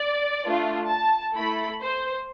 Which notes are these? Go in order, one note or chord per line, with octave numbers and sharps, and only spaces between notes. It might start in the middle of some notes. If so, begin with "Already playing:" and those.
Already playing: D5
A3 D4 F4
A5
A3 E4 A4 B5
C5